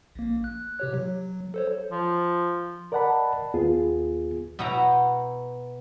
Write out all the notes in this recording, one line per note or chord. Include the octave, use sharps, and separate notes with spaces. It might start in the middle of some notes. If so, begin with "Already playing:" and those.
A#1 A#3
F#6
C3 G4 C#5
F#3
A4 C5 C#5
F3
A#4 D5 D#5 F#5 A5 B5
D#2 B3 F4 G#4
B2 B3 E4 F#5 G5 A#5